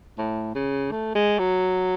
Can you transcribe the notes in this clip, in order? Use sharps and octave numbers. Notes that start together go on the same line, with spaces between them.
A2
C#3
A3
G#3
F#3